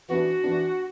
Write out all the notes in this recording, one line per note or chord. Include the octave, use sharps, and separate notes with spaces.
E3 B3 D4 F#4
E3 B3 D4